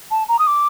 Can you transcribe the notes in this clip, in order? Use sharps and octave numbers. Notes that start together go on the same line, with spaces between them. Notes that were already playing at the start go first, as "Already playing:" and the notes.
A5
A#5
D#6
D6